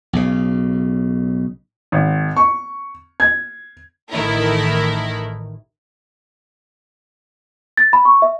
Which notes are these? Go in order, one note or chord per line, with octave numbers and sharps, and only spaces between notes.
B1 C#3
G#1
C#6
G#6
A1 D#3 A3 E4 A#4
A6
B5
C#6
E5